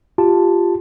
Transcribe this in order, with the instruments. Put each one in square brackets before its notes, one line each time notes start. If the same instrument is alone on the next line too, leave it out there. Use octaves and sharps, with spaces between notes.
[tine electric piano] F4 G4 A5